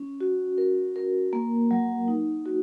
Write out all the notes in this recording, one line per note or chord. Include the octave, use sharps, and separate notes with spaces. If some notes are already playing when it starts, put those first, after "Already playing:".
Already playing: C#4
F#4
A#4
A#4
A#3
F#3
D#4
F#4